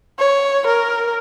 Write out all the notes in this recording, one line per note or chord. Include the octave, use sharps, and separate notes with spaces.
C#5
A#4